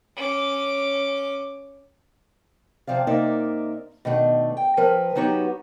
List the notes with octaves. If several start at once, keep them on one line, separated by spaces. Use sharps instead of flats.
C#4 D6
C3 F3 C4 D5 F5
C3 A#3 D#4 A#4 D5 E5
B2 D#3 A3 D4
G5
F3 A#4 B4
F#3 B3 D#4 F#4 G4